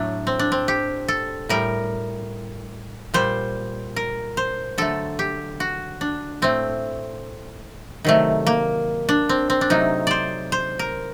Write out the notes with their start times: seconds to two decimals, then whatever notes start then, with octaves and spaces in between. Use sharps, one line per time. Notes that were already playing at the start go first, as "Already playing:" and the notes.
Already playing: A2 F#3 A3 D4
0.27 C4
0.39 D4
0.52 C4
0.68 G4
1.08 A4
1.49 A2 G3 A#4
3.14 A#2 G3 C5
3.96 A#4
4.37 C5
4.78 D3 F#3 A3 A4
5.19 G4
5.60 F#4
6.01 D4
6.42 A2 A3 C4
8.05 C3 D#3 F#3 A3
8.47 A#3
9.09 D4
9.29 C4
9.50 C4
9.61 D4
9.70 C3 F#3 A3 D#4
10.07 C5 D5
10.52 C5
10.79 A#4